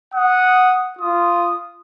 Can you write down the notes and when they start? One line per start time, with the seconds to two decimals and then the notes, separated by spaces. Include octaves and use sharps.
0.14 F#5 D#6
0.99 F4 D#6